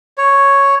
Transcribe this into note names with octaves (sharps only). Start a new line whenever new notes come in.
C#5